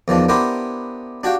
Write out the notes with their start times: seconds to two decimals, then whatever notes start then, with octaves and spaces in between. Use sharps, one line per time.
0.08 E2 D#3 F3 D4
0.28 B3 D4 E4 G4 A#4 C5
1.24 D4 F#4 G4 F5 G5